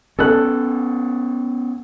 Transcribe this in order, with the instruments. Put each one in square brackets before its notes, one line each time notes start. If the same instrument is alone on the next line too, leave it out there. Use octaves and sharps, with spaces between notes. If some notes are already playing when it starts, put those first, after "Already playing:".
[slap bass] B3 C#4 [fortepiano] A4 F#6